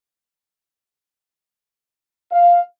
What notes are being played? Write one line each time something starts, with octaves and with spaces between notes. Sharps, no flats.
F5